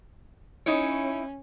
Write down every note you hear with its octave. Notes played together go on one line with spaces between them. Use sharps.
C#4 D#4 E4 C#5